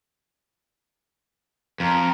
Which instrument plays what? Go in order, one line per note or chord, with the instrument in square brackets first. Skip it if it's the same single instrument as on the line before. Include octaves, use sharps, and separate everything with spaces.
[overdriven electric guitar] F2 [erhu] A#4